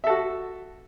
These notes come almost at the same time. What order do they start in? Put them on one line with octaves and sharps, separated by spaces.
E5 A4 F#4